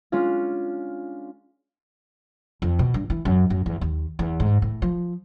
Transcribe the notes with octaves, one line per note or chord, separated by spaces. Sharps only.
G#3 C#4 D4 F4
F2
B2
G2
E3
F#2
F#2
E2
D#2
E2
G#2
A2
F3